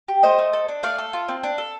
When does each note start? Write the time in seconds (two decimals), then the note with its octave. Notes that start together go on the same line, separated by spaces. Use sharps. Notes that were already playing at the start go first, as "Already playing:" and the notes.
0.08 G4
0.23 A3 C5 D#5
0.39 A3
0.53 A4
0.68 D4
0.83 A3 D5 F5
0.98 A4
1.13 F4
1.28 C4
1.43 D4
1.58 A4